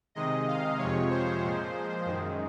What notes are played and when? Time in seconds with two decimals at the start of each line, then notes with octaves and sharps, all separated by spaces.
0.15 C3 D#3 G#3 D#5
0.47 F5
0.78 F2 C3 F3 G#3 C#5
1.10 C5
1.42 A#2 F3 G#3
2.06 F#2 D#3 G#3